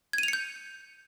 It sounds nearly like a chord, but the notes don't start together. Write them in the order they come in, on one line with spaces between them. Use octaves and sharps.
G#6 D#7 F7 C#7 G6